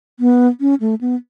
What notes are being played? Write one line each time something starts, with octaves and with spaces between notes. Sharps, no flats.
B3
C#4
A3
B3